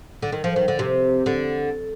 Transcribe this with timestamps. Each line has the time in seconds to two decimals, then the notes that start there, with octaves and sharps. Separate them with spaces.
0.22 D3
0.32 D#3
0.44 F3
0.56 D#3
0.68 D3
0.79 C3
1.26 D3